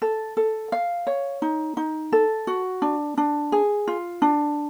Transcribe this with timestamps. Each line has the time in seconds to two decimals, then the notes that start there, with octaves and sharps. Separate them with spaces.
0.02 A4
0.37 A4
0.72 F5
1.07 C#5
1.42 D#4
1.77 D#4
2.12 A4
2.47 F#4
2.82 D4
3.17 D4
3.52 G#4
3.88 F4
4.22 D4